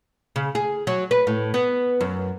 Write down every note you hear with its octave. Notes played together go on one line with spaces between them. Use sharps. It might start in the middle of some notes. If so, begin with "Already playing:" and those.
C#3
G#4
F#3
B4
A2
B3
F#2